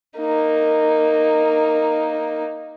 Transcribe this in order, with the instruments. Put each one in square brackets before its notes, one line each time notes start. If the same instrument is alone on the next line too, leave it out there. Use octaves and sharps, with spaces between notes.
[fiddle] A#3 D#4